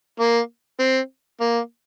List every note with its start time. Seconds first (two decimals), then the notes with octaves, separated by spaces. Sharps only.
0.20 A#3
0.80 C4
1.41 A#3